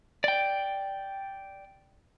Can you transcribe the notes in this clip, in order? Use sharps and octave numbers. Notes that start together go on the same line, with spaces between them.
D5 G5